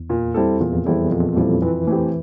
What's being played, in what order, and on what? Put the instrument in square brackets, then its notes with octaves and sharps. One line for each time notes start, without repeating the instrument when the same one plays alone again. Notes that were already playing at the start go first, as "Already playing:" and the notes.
Already playing: [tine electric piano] E2
[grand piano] A#2
G3 C4 E4 A4
[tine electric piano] E2 [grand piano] A#2
[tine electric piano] F2
[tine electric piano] E2 [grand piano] G3 C4 E4 A4
[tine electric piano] F2 [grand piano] A#2
[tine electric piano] A#2 [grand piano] G3 C4 E4 A4
[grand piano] F2 [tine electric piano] E3
[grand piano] E3 A3 C4 G4